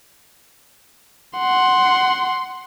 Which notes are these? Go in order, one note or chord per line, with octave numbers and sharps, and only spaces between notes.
F#5 C6